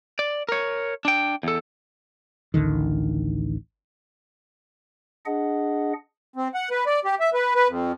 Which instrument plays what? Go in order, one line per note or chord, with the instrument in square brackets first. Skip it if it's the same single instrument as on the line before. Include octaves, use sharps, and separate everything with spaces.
[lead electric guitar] D5
A#4 C#5
D4 G5
E2 A4
[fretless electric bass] A1 D2 D3 D#3
[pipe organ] D4 G#4 D#5 F#5
[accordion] C4
F#5
B4
D5
G4
E5
B4
B4
F2